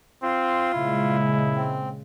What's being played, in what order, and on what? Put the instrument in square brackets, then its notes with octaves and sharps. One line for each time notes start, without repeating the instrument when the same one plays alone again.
[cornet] C4 [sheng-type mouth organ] F4
[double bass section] A#2 C#3 G#3 [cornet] E4
[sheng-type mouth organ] C4